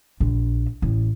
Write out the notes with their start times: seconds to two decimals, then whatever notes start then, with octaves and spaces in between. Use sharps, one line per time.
0.20 A#1
0.82 A1